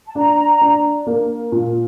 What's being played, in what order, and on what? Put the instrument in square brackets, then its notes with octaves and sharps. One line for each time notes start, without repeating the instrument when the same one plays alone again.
[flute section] A5
[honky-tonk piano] D4 [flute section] A#5
[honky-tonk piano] D4
A#3
A#2